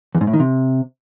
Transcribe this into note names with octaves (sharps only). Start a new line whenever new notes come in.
E2
G#2
A2
D#3
C3